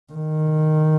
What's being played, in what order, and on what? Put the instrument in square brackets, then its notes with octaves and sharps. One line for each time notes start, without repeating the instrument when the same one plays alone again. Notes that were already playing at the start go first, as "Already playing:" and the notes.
[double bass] D#3